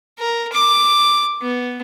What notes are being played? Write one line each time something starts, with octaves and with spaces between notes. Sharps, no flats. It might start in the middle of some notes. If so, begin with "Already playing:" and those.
A#4
D6
B3